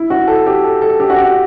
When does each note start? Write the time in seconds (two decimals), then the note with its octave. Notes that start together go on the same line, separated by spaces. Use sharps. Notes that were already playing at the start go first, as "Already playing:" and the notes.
Already playing: E4
0.10 F#4
0.28 A4
0.47 G4
0.64 A4
0.81 A4
1.00 G4
1.10 F#4
1.17 G4